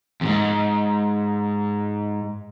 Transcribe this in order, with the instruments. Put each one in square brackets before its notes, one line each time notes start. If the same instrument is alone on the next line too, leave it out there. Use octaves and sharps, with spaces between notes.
[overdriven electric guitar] E2 G#2